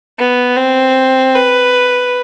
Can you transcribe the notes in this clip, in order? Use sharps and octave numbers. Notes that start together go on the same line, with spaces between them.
B3
C4
B4